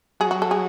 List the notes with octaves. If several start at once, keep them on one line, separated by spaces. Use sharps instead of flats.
F#3 G#4
F#4
A4
G#4